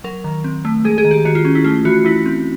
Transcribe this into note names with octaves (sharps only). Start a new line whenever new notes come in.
F#3 A#4
D#3
C4
A3
G#3 G#4
G#4
D#3
G4
D#3 F#4
F4
C#4
E4
A3 F4
E3 F#4
E3 E4
C4